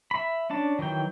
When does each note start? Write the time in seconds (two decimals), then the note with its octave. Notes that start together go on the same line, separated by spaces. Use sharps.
0.11 E5 B5
0.50 C#4 D4 A5
0.79 D#3 E3 F#3 G5